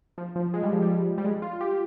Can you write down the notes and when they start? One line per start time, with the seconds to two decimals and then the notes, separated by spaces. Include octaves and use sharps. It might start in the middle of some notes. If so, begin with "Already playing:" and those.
0.18 F3
0.36 F3
0.54 G#3
0.63 G3
0.73 F3
0.82 G3
1.18 G3
1.24 G#3
1.42 F4
1.61 G4